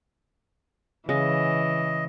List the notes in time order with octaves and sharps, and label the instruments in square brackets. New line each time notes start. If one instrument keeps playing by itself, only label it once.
[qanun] C#3 G#3 [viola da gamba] E3 [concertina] D#5